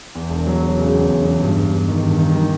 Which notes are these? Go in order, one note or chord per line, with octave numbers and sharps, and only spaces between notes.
E2
E1
F#3
F#3
C#3
E2
E1
E2
G2
G2
G2
D#3
G2
D#3
D#3